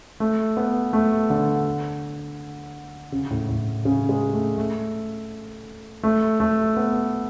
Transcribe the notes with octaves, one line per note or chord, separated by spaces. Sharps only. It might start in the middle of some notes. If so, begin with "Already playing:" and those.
A3
B3
A3
D3
C#3
A2
A2
C#3
G#3
A3
A3
A3
A3
B3